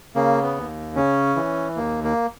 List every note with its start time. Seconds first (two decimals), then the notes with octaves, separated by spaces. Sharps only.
0.15 C#3 A#3
0.42 B3
0.56 D#2
0.96 C#3 C#4
1.36 E3
1.76 D#2 A#3
2.04 A#3